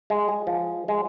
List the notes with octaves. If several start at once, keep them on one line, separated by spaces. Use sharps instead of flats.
G#3
G#4
F3
G#3